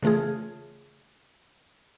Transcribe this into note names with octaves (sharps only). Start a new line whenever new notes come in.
C#3 E3 A3 F4 G#4